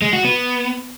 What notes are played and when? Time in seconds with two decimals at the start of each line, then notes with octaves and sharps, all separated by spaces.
0.02 G#3
0.13 F#4
0.25 B3